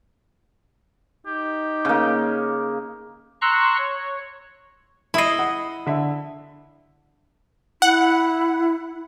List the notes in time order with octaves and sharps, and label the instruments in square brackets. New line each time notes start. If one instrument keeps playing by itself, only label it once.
[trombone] D#4 [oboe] G4
[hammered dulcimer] C#3 A#3
[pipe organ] A#5 C6 C#6 E6 F#6
C#5
[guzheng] E4 D#5 [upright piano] B5 D#6 C7
[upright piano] F#5
D3 E5
[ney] E4 [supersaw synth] F#5